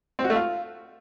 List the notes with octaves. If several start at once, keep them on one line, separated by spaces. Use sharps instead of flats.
C4
F#4
A3
F4